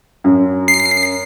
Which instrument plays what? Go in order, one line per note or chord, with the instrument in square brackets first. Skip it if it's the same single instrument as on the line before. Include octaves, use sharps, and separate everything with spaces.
[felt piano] F#2
[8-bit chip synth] C7